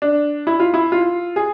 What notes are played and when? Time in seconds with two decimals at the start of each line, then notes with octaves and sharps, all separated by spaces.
0.02 D4
0.47 E4
0.60 F4
0.74 E4
0.92 F4
1.36 G#4